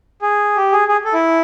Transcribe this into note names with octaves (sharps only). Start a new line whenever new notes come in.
G#4
G4
G#4
G#4
A4
E4